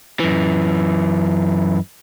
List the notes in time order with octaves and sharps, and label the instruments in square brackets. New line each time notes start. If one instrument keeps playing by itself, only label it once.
[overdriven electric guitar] F#2 E3